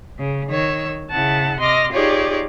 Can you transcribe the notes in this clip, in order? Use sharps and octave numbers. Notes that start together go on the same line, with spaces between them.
C#3
D#3 C#5 E6
C#3 E4 F#5 A5
C3 D#5 C6 D6 F6 A#6
D#4 F4 G4 G#4 C#5 D5